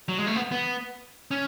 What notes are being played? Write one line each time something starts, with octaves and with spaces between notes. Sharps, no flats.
F#3
G#3
A3
B3
B3
C#4